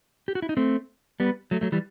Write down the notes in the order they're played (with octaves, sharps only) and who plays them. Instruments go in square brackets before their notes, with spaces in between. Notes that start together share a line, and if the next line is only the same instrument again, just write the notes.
[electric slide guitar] G4
F#4
E4
D#4
A3 C4
G3 B3
F#3 A3
F#3 A3
E3 G3